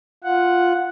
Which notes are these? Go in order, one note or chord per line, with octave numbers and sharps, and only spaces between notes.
F4 F#5